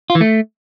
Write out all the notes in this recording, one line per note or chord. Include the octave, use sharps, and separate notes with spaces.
F4
E3
A3